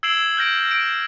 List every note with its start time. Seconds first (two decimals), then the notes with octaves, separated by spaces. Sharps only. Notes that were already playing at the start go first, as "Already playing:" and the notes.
0.03 E6 G#6 C7 D7 E7 F#7
0.37 F6 G6 A#6 D7
0.71 D7 E7